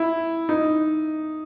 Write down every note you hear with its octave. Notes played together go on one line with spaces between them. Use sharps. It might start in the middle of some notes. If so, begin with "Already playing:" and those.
Already playing: E4
D#4